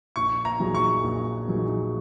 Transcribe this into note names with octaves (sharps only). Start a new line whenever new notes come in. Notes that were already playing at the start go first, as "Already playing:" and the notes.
A#1 C#6
A#5
A#2 F#3 D#4 G#4
C#6
A#1
A#2 F#3 D#4 G#4